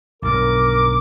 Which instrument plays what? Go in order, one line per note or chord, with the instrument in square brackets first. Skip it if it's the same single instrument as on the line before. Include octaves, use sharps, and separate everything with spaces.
[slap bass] B1 G2 [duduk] A#4 [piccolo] D6